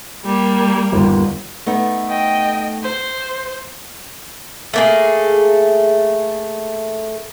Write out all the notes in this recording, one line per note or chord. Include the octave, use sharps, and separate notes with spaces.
G3 A#3
G1 D#2
A3 B3 D#4
D#5 G5
C5
A3 A#3 G#4